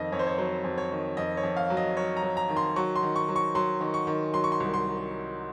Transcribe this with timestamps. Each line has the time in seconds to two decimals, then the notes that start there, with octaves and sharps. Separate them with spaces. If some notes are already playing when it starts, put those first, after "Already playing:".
Already playing: F2 D#3 D#5
0.12 F2 C#5
0.19 C5
0.27 C#5
0.38 F#3 C5
0.64 F2
0.78 C#5
0.92 D#3
1.17 F2 D#5
1.37 C#5
1.43 F2
1.57 F5
1.70 F#3
1.77 D#5
1.97 F#3 C#5
2.17 A#5
2.23 F#3
2.37 A#5
2.49 D#3
2.57 C6
2.76 F#3 C#6
2.96 C6
3.03 D#3
3.16 C#6
3.29 F#3
3.36 C#6
3.55 F#3 C6
3.81 D#3
3.94 C#6
4.07 D#3
4.33 F#3 C6
4.44 C#6
4.52 C6
4.60 C2
4.74 C6